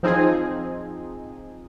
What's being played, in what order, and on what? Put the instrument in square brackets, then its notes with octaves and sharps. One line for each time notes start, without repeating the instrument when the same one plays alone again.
[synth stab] F3 C4 D#4 G#4